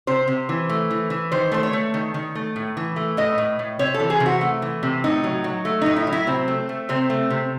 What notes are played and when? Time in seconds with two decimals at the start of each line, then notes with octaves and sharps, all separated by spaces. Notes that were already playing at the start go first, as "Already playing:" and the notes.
0.07 C3 C5
0.28 C3
0.49 E3
0.69 A3
0.91 E3
1.10 E3
1.32 D#3 C5
1.52 A3 C5
1.63 C#5
1.73 A3
1.94 D#3
2.14 D#3
2.35 A3
2.56 A2
2.77 E3
2.96 A3
3.17 A2 D#5
3.38 A2
3.59 A2
3.79 C3 C#5
3.94 A4
4.00 E3
4.10 G#4
4.20 C3
4.26 F#4
4.41 A3
4.62 E3
4.83 C3
5.04 A2 D#4
5.24 F#3
5.44 F#3
5.65 A3
5.82 A2 D#4
5.96 E4
6.07 F#3
6.13 E4
6.27 C3 C4
6.48 A3
6.69 A3
6.89 C3 C4
7.10 A3
7.30 C3